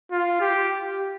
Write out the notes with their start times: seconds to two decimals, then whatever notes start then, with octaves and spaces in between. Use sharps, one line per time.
0.11 F4
0.41 G4